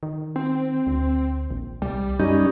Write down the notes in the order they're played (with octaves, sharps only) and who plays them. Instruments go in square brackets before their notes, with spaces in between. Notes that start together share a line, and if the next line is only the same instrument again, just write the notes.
[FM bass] D#3
[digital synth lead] C4
[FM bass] D2
A#1
[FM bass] C2 [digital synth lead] G3
[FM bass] F#2 [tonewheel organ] G3 D#4 [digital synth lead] C#4